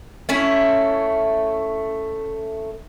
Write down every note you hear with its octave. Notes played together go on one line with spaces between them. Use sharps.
A3 C#4 E4